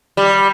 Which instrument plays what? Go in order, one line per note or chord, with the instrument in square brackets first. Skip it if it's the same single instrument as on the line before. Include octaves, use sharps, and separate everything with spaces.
[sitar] G3